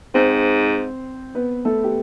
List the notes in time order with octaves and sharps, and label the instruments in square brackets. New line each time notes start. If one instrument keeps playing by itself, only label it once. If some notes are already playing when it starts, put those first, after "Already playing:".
[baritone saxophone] G#2 [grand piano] C4 C5
[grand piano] B3 B4
A3 A4
G4